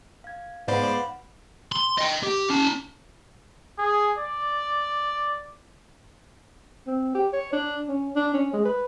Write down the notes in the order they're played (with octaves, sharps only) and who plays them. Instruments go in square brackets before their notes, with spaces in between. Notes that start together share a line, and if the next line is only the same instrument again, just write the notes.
[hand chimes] F5 G#6
[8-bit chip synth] G#2 C5 D5 [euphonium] B3 [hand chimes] F5 F#5 B5
[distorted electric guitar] C6
D#5 G5
G4
C#4 A5
[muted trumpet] G#4
D5
[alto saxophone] C4
G4
C#5
D4
C#4
D4
C#4
G#3
B4